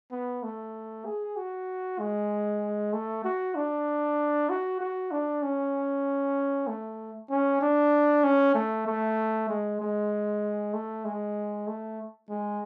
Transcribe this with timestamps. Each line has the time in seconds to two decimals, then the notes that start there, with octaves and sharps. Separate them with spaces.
0.12 B3
0.43 A3
1.05 G#4
1.37 F#4
1.99 G#3
2.93 A3
3.24 F#4
3.55 D4
4.49 F#4
4.80 F#4
5.11 D4
5.43 C#4
6.67 A3
7.30 C#4
7.61 D4
8.24 C#4
8.54 A3
8.87 A3
9.49 G#3
9.80 G#3
10.73 A3
11.05 G#3
11.67 A3
12.29 G#3